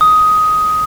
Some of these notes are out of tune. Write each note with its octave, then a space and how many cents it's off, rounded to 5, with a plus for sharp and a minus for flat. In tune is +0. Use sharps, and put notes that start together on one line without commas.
D#6 +10